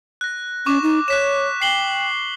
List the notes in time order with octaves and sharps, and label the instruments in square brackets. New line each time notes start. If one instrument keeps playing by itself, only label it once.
[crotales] F#6 A#6
[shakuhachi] C#4 [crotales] C#6 D6 E7
[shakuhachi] D#4
[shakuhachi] C#5 [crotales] F#6 B6 E7
[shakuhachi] G5 [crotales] C7 F#7 G7